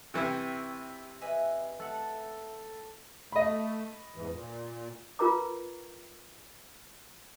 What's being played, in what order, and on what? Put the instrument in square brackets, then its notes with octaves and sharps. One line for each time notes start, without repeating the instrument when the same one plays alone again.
[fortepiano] C3 E3 E4 [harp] G5 C#6
[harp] B4 D#5 G#5 [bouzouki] E5
[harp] A3 F#5 [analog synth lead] A4
[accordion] A3 [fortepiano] D#5 B5
[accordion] E2 G#2 E3
A#2
[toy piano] F4 A#4 B4 A#5 D6